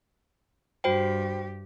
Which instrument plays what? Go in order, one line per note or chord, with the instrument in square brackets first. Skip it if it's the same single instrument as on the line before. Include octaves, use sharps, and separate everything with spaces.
[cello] G2 G4 [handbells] F#4 C5 G5